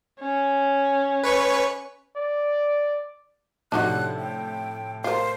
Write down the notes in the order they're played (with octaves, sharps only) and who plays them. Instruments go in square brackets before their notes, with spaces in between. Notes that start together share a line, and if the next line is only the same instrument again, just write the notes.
[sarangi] C#4
[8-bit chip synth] B4 C#5 C#6
[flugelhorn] D5
[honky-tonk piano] A2 C3 F3 [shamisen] D4 D#4 F#4 [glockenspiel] A5 [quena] F#6
[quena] G5
[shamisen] F4 A#4 [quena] C5 [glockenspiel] C7